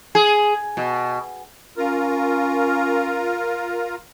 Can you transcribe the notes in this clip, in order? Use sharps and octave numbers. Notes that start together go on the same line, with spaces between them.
G#4
B2
C#4 F4 A#4